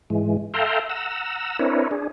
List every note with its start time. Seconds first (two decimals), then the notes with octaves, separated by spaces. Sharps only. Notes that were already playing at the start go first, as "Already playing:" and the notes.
0.10 G#2 E3 G#3
0.54 A4 E5 F5 G5 A#5 C6
0.90 F#5 A#5 E6
1.59 C4 D4 E4 A#4 B4 C#5
1.91 D4 G#4